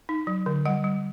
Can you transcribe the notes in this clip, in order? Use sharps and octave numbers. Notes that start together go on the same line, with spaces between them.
D#4
F#3
D3
G3 F#5
G3